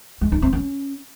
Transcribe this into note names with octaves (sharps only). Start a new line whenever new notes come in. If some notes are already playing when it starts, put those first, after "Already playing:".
G#3
D#4
C4
C#4